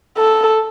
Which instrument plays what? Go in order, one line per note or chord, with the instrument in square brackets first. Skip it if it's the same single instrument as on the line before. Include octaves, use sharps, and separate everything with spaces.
[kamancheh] A4